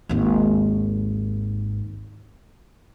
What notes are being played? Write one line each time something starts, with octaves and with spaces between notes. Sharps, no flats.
G#1 D#2